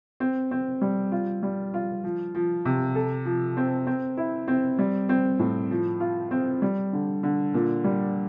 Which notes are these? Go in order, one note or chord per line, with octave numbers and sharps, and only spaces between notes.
C4
C4
G3
F4
G3
F4
F3
F3
C3
A4
F3
C4
C4
E4
C4
G3
C4
A2
F3
F4
C4
G3
D3
D3
A#2
G3